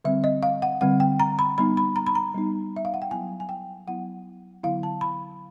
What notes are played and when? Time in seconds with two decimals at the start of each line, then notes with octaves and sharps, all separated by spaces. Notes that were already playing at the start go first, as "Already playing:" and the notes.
0.04 D3 G3 C4 E5
0.24 D#5
0.43 F5
0.62 F#5
0.81 D3 G3 C4 F#5
1.00 G5
1.20 A#5
1.39 B5
1.58 G3 B3 D#4 B5
1.77 B5
1.96 A#5
2.07 B5
2.15 A#5
2.34 G3 B3 D#4
2.76 E5
2.85 F5
2.94 F#5
3.02 G5
3.10 F#3 B3 E4 G#5
3.40 G#5
3.49 G5
3.87 F#3 B3 E4 F#5
4.63 D3 F#3 B3 E4 F5
4.83 A5
5.01 B5